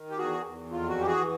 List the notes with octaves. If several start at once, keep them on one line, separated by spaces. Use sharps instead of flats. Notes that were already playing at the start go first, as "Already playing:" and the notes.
Already playing: D#3
G4
E2 F#4 G#4
E2
F2 F4
F#4
E3 G4
F#4 G#4